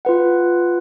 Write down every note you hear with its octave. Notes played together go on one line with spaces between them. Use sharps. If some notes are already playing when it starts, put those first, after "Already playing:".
F4 B4 F#5